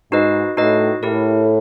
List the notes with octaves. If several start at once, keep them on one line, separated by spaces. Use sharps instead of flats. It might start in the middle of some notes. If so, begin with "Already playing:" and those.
G#2 D#4 F#4 B4 D#5
A2 D#4 F#4 B4 D#5
A2 E4 G4 A#4